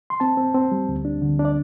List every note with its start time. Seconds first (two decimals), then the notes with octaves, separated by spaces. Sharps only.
0.10 C6
0.20 C4 A5
0.37 C4
0.54 C4
0.72 G3
0.89 D2
1.05 D4
1.22 D3
1.39 D4
1.45 D5